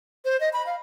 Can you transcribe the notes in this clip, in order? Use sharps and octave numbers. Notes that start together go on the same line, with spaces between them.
C5
D#5
B5
F5